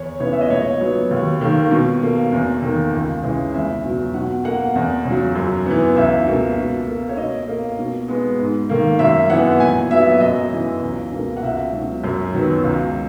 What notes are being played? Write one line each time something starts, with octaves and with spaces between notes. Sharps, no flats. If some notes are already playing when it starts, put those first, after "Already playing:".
Already playing: E2 C#5
C#3 E3 B3 C#5
E5
D#5
A#2 C#5
F#3 B3
D#2
D#3 A#3
B2
A#3
E2
D#3 A#3
C#2
C#3 E3 G#3
E2 E5
B2 F#3
B2 F#5
A#3 F#5
E2
C#3
F#3
F#2
E3 B3
C#2 E5
B2 A#3
B2
A#3
C#5
B2 D#5
A#3
B2
G#3 B3
G#2
D#3 A#3
F#2 E5
E3 B3 F#5
A#2 G#5
F#3 B3 E5
F#2 D#5
E3 B3
C#2
B2 A#3
F#5
C#2 E5
B2 F#3
F#2
D#3 F#3 B3
C#2